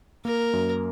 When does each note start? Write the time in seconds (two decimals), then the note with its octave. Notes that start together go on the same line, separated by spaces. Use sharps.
0.25 A#3 A#4
0.53 F#2